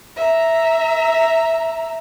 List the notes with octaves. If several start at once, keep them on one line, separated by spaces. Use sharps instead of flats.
E5 A#5